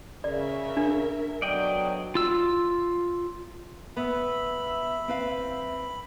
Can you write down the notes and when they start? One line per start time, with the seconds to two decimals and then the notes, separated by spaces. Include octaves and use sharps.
0.24 C#3 A#4 D5 E5
0.77 D4
1.42 B2 D3 F#3 D5 D#5 G5
2.15 F4 E6
3.97 B3 E5 B5
5.08 C4 B4 F5